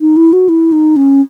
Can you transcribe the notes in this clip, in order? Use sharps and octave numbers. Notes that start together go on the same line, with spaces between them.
D#4
E4
F#4
E4
D#4
C#4